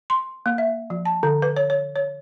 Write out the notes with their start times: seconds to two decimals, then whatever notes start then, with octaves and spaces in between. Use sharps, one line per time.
0.10 C6
0.46 A#3
0.58 E5
0.90 F3
1.05 A5
1.23 D3
1.42 B4
1.57 C#5
1.70 C#5
1.96 C#5